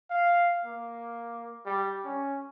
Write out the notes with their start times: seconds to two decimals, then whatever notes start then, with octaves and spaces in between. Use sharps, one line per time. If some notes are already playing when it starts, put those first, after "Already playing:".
0.10 F5
0.65 A#3
1.66 G3
2.05 C#4